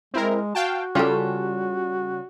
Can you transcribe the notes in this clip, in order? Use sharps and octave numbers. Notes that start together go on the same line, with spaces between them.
G#3 C4 E4 A#4
F#4 F5 G5 A5
C#3 G3 C#4 F4 A4